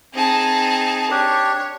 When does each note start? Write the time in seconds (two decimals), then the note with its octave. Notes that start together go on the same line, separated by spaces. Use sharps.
0.14 C4 D#4 G#4 A5
1.11 D4 G4 C#5